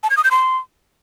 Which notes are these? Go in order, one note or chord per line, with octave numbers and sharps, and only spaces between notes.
A5
G#6
D#6
G6
C6